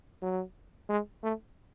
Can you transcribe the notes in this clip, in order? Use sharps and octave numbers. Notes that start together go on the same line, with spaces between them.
F#3
G#3
A3